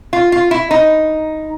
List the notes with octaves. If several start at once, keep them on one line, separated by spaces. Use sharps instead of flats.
F4
F4
E4
D#4